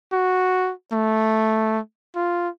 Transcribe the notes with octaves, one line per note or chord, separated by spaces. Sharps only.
F#4
A3
F4